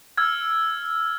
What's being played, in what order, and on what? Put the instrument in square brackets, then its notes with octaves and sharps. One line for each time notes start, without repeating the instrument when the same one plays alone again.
[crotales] E6 F6 G#6